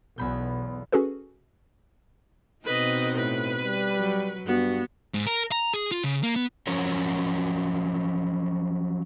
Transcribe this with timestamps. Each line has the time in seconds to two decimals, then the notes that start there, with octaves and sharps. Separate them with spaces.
0.18 B1 E2 B3 B5 G6
0.92 C#4 F#4 G#4 A4 B4
2.65 B2 C4 D#4 B4 D#5
3.16 A2 B4
3.63 G3
3.97 F#3
4.46 G2 B3 F#4
5.14 G#2
5.27 A#4
5.52 A#5
5.74 G#4
5.92 F4
6.04 C#3
6.23 A#3
6.36 B3
6.67 F3 F#3 C#4 F#4 A#4 C#5